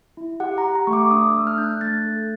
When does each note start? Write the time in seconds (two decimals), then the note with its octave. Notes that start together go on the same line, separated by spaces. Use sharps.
0.17 E4
0.40 G4 F#5
0.58 A#5
0.64 G4
0.75 A#5
0.87 A3 C#6
0.93 D6
1.11 D4 D#6
1.29 E6
1.35 A3
1.47 F6
1.58 D4 G6
1.64 F#6
1.81 A3 A6
2.06 A4